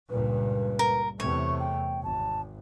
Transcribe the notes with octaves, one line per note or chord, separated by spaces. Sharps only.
C#2 G2 A#2 B4
A#4
E2 C3 A3 C#5 C#6
G5
G#1 A5